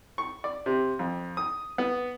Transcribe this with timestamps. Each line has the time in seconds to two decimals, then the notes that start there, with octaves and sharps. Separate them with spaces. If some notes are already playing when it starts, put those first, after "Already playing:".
0.18 C#6
0.44 D5
0.66 C3
0.99 F2
1.37 D#6
1.78 B3